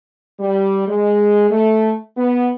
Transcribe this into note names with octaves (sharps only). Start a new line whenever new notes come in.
G3
G#3
A3
B3